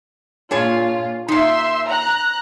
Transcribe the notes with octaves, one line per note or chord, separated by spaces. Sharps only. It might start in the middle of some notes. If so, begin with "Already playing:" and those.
A#2 D4 F4 G#4 C#5
A#2 D#4 E5 C6
A#5 F#6